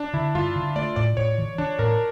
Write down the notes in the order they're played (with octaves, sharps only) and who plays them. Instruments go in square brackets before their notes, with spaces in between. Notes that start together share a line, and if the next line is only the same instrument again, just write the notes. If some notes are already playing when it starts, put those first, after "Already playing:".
Already playing: [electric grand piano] D4
[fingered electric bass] D3 [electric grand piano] E4
[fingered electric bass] G2 [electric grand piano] F4
[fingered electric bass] D3
[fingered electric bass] A3 [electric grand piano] D5
[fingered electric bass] A2 [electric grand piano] D5
[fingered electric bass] A2 [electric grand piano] C#5
[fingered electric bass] E3
[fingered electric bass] E3 [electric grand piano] D4
[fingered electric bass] A2 [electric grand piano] A#4